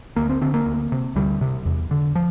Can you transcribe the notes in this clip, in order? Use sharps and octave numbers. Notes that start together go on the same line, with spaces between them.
D2 A#3
C4
D3 C4
A#3
D2
C3
D2 G3
C3
E2
D3
F3